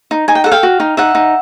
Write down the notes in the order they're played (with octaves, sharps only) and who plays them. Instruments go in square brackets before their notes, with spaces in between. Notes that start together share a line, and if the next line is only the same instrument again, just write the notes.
[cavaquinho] D#4
D#4 G#5
G5
A4 F#5
F5 G5
F#4
D#4
D#4 E5 F#5
D#4